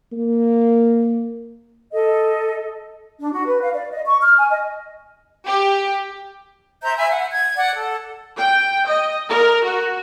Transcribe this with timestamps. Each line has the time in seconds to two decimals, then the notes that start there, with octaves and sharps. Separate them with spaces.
0.12 A#3
1.92 A4 D#5
3.21 D4
3.33 F#4
3.47 B4
3.62 F5
3.74 D5
3.92 D#5
4.06 C#6
4.22 F6
4.38 G#5
4.50 D#5
5.46 G4
6.82 C5 E5 A#5 G6
6.97 E5 G#5 B5 E6
7.11 F#5
7.32 G#6
7.56 D5 F#5
7.75 A4
8.37 G5
8.88 D#5
9.31 A#4
9.65 F#4